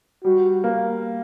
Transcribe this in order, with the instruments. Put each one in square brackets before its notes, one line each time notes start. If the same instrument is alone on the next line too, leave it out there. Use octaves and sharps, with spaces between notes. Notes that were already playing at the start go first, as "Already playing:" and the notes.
[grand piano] G3 [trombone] F#4
[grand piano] A#3